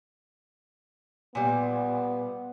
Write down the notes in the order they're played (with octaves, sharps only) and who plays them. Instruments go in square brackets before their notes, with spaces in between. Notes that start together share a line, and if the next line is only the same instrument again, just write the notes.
[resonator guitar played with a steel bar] A#2 G3 [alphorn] B3